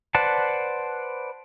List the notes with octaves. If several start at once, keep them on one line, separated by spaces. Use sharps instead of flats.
B4 C5 D5 F#5 A5